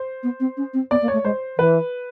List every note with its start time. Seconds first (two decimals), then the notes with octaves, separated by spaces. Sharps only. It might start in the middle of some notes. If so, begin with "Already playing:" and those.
Already playing: C5
0.23 B3
0.40 C4
0.57 C#4
0.74 C4
0.91 B3 D5
1.02 A#3
1.08 C#5
1.13 A3
1.24 G#3 C5
1.58 E3 B4